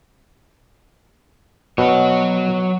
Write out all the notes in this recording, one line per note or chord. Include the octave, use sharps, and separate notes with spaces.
B2 F#3 C#5